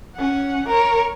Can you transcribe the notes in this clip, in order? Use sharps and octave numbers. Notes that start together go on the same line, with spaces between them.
C#4 F#5
A#4 C#5